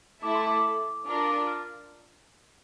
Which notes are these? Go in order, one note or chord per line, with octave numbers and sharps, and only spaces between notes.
A3 E4 A4 E5 A5 D6
C6
D6
D4 F4 A#4 D6
D6
F6